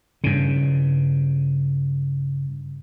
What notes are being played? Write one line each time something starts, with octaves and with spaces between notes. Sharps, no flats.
G2 C#3